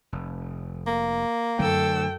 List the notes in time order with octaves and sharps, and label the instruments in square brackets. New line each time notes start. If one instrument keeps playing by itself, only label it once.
[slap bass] F1
[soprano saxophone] A#3
[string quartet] F#2 A4 E6 [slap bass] D3 F#3 A3 [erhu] G5